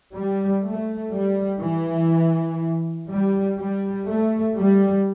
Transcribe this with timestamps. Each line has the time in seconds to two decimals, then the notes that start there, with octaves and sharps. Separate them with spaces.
0.14 G3
0.64 A3
1.12 G3
1.61 E3
3.09 G3
3.59 G3
4.08 A3
4.56 G3